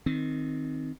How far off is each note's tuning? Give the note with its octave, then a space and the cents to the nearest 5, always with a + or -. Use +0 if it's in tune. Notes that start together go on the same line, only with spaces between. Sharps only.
D#3 +0 C4 +0